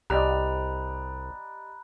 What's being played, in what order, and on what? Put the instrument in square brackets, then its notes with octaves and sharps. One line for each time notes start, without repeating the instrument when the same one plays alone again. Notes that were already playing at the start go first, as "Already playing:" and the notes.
[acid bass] C2 [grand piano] G4 D5 D#5 [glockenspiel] A#5 B5 F#6